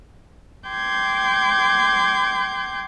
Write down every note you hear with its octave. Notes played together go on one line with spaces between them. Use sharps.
G5 C6 D6 G6 G#6